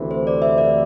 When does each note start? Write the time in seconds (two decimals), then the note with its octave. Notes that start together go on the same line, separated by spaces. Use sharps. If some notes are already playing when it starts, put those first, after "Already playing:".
Already playing: D2 C3 E3
0.11 C5
0.27 D5
0.42 E5
0.58 D5